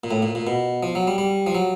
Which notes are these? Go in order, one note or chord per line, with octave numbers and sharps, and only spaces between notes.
A#2
A2
A#2
A#2
B2
F3
F#3
G3
G3
F3
F#3